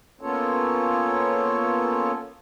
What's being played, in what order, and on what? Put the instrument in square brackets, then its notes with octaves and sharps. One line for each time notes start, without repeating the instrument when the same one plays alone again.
[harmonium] A#3 B3 C#4 F4 A4 C#5